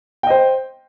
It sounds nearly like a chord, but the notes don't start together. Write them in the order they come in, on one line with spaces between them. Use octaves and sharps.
G5 D#5 C5